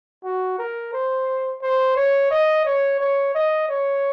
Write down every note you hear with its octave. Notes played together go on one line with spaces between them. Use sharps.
F#4
A#4
C5
C5
C#5
D#5
C#5
C#5
D#5
C#5